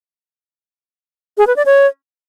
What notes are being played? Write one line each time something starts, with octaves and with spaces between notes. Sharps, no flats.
G#4
B4
D5
C#5